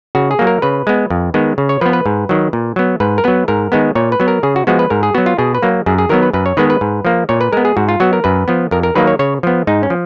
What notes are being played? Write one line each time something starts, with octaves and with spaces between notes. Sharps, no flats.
C#3 F#4
G#4
F#3 A#3
A#4
C#3 B4
G#3 B3
F2
D#3 G#3 B3
C#3
C#5
F3 B3 B4
B4
G#2
D#3 F#3
A#2
F#3 B3
G#2 B4
A#4
F#3 B3 B4
G#2 A#4
D#3 G#3 B3
A#2 C#5
B4
F#3 B3
A#4
C#3 G#4
F#4
F3 G#3 B3 F#4
B4
G#2 A#4
G#4
F#3 B3 F#4
F4
B2 G#4
B4
F#3 A#3
F#2 G#4
G#4
D#3 F#3 B3 A#4
B4
F#2 B4
C#5
D#3 G#3 B3 B4
B4
G#2
F3 A#3
A#2 C#5
B4
G#3 B3 A#4
G#4
G#2 F#4
F4
F#3 B3 F#4
A#4
F#2 B4
F3 B3
F2 A#4
A#4
D#3 F#3 A#3 B4
C#5
C#3 C#5
F3 B3
G#2 D#4
C#4
F3